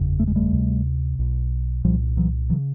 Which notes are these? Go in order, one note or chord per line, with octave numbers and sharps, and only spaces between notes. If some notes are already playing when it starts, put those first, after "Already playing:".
Already playing: F#1 E2 C#3
A3
G#3
G3 A3
D2 C3
B1 B2
C2 A#2 F3 G3
E3 F#3
E3 F#3
C#3